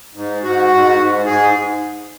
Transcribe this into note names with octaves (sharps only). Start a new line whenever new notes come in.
G#2
G#2 F#4
G#2
G#2
G#2 G#4